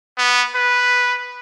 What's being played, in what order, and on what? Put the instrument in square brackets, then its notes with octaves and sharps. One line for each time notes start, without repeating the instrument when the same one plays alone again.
[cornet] B3
B4